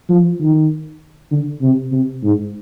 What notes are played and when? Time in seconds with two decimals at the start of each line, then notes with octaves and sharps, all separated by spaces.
0.09 F3
0.39 D#3
1.31 D3
1.62 C3
1.92 C3
2.23 G#2